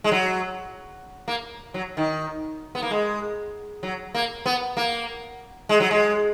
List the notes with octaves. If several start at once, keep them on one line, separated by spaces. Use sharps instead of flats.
G#3
F#3
A#3
F#3
D#3
B3
A#3
G#3
F#3
A#3
B3
A#3
G#3
F#3
G#3